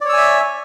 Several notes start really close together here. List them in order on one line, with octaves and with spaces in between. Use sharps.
D5 C#5 E6 G#5 E5